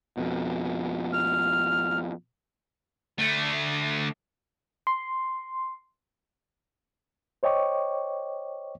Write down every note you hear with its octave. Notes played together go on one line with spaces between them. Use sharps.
F2 B2
F6
D2 A3
C6
C5 C#5 D#5 G5 C#6 D6